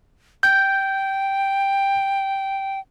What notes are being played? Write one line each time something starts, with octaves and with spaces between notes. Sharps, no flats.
G5 G6